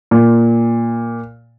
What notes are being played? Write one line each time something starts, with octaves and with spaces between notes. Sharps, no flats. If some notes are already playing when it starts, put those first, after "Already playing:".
A#2